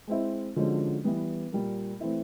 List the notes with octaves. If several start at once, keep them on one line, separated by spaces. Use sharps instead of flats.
G#3 C4 E4
D3 F3 G#3 C#4 F#4
E3 G3 B3
A#2 G3 A#3
E3 A3 C4 E4